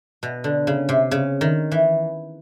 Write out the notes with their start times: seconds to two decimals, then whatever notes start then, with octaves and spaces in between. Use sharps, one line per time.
0.23 B2
0.44 D3
0.67 C#3
0.89 C3
1.11 C#3
1.41 D#3
1.72 E3